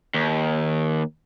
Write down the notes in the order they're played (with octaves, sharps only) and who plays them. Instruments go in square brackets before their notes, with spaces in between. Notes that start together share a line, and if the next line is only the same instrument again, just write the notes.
[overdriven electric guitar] D#2